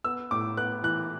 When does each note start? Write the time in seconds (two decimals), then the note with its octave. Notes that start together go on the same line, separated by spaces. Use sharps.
0.04 B3 E6
0.31 A2 D6
0.57 B3 F#6
0.83 E3 F#6